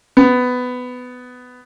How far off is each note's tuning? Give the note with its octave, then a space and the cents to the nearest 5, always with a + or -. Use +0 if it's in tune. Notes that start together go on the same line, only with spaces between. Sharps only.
B3 +15